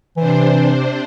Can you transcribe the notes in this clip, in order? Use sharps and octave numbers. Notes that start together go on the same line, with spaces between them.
C3 E3 D4 C5